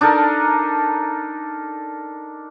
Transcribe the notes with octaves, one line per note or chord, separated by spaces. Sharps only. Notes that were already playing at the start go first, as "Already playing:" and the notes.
D4 D#4 A4 A#4